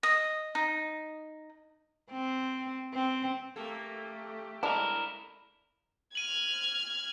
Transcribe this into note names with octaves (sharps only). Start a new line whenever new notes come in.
D#5
D#4
C4
C4
A3 A#3 G4 A4
G#3 D4 E4 A#4
F6 G#6 D#7 F#7